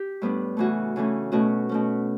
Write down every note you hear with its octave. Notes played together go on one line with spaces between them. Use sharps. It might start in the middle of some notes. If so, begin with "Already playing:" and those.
Already playing: G4
A2 G3 B3 D4
C#3 E3 A3 C#4 F#4
C#3 E3 A3 C#4
B2 A3 C#4 F#4
B2 A3 C#4